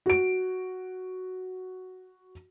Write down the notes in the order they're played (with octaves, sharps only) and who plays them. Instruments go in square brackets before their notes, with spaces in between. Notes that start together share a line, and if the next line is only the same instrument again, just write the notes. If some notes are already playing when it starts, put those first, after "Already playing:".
[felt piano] F#4 D7